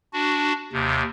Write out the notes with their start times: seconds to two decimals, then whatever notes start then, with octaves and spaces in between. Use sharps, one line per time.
0.13 D4 F#4
0.73 D#2 C3